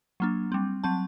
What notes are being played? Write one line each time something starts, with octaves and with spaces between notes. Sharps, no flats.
F#3 A#3 D4
G3 C4
F#3 C4 A5